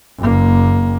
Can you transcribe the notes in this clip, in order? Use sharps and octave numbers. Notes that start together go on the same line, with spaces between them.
F#1 A#3